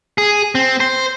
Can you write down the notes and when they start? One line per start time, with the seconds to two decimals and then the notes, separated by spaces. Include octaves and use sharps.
0.18 G#4
0.55 C4
0.80 C5